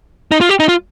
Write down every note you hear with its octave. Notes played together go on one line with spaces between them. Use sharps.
D#4
F4
G4
D#4
F4